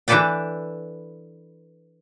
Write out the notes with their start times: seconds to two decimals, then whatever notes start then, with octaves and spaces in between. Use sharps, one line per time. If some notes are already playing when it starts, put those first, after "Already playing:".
0.08 E3 D4 A4 B4 D5 G5